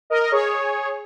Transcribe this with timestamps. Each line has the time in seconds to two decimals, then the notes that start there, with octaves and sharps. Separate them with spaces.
0.10 A#4 D#5
0.21 D#5
0.32 G#4 C#5